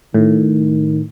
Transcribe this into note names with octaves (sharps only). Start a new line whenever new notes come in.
A2 D#3